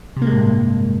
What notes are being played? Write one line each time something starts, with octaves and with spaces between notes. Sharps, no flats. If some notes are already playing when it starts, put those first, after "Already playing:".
C3
A#3
G#3
A2
G2